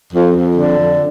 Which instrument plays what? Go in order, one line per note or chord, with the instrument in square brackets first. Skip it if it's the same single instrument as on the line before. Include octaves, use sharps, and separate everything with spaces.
[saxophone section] F2
F2
D3
F2